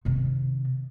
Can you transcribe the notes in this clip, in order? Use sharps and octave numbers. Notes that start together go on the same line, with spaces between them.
C3 D#3